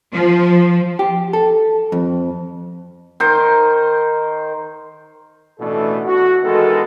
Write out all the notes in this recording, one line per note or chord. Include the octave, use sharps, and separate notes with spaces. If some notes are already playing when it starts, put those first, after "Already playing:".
F3
G4
A4
F2
D#3 C5
A1 B2 E3 A3 D4 A4
F#4
D#3 E3 G#3 B3 A4